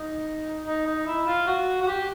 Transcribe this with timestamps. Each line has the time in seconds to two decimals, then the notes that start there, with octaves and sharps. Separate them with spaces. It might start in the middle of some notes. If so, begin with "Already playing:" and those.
Already playing: D#4
0.67 D#4
0.86 D#4
1.07 E4
1.27 F4
1.47 F#4
1.82 F#4
1.88 G4